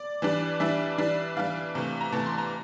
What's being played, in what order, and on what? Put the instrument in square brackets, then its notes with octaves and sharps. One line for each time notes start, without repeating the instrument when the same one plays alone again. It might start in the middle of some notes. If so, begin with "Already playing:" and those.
Already playing: [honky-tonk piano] D5
E3 G3 D4
E3 G3 D4 E5
E3 G3 D4
E3 G3 D4 F5
C3 E3 A3
A#5
C3 E3 A3 A5
C6
A#5